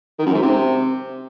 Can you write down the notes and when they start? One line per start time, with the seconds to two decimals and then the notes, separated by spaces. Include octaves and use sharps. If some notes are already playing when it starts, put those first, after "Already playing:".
0.18 D#3
0.26 F#2
0.34 G#2
0.42 C3